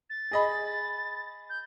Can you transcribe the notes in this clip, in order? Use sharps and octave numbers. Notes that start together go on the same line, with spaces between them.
A6
G#4 D#5 B5
G6